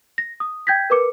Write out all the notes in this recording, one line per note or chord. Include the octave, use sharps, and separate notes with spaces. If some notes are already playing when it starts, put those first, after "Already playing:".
A#6
D#6
G5 G6 G#6 A#6 B6
A#4 B4 D6 C#7